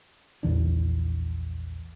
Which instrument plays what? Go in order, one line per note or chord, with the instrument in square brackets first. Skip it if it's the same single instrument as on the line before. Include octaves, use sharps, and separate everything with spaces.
[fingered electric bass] A#1 E2 E3 D4